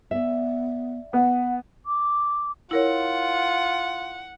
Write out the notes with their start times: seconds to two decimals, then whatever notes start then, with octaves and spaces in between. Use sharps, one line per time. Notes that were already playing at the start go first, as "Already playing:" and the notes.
0.11 B3 D5 E5
1.13 B3 F#5
1.86 D6
2.71 E4 F4 A#4 C#5 F#5